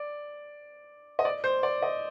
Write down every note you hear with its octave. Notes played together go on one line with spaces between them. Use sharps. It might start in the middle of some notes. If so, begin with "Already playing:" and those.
Already playing: D5
D#5
D5
C5
D5
D#5